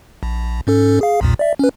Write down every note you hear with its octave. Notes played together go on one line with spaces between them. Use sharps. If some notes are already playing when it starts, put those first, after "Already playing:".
A#1
G#2 C#4 A4
G#4 F5
B1 E2 A#2
D5 E5
C#4 B4